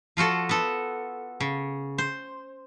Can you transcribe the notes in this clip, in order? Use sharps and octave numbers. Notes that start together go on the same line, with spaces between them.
F3 F4 F#4 A4
B3 A4
C#3
C5